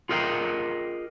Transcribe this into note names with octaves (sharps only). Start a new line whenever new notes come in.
F4 G#4 A#4 D#5 F5 G5